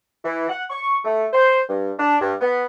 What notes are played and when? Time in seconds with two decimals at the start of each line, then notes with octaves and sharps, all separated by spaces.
0.24 E3
0.50 F#5
0.70 C#6
1.05 A3
1.33 C5
1.69 G2
1.99 D4
2.21 G2
2.41 B3